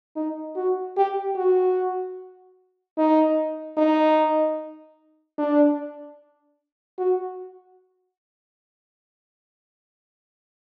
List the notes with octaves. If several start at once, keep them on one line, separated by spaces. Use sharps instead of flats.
D#4
F#4
G4
F#4
D#4
D#4
D4
F#4